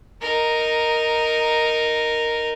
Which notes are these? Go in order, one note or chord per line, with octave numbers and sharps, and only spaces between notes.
D#4 A#4